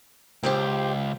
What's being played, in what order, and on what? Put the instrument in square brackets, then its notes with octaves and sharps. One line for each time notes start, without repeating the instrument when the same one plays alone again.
[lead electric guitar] C#2 [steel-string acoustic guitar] G4 C5 G5